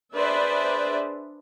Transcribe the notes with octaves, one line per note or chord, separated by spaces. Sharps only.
D4 G#4 B4 C5 D5 E5